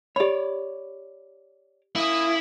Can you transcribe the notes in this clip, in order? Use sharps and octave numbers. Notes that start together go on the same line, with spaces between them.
G4 C#5 D5 B5
A#3 C#4 E4 D#6